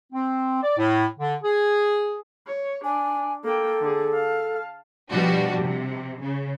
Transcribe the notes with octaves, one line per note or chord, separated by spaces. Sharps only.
C4
D5
A2
D3
G#4
C#5
D4 G#5
A#3 A4 G5
D3 G#4
F5 A5
B2 F3 G3 D4 F#4
C3
C#3